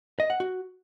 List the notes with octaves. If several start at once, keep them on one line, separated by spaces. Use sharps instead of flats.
D#5
F#5
F#4